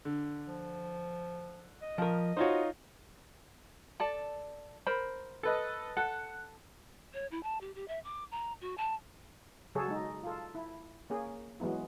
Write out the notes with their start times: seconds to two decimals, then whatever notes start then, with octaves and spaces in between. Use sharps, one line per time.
0.05 D3
0.48 F3
1.81 D#5
1.98 F3 A#4
2.37 D#4 F4 F#4 C5 C#5
4.00 A4 D5 A5
4.87 A#4 C5 B5
5.43 A4 B4 D#5
5.97 A4 F#5
7.14 C#5
7.31 E4
7.43 A5
7.61 G4
7.75 G4
7.88 E5
8.04 D6
8.31 A#5
8.61 F#4
8.78 A5
9.75 C#3 F#3 F#4 G#4 A4 C#5
9.88 G#3 D#4
10.23 F4 A4
10.55 E4
11.10 A#3 C#4 G#4
11.60 E3 F#3 G#3 B3 E4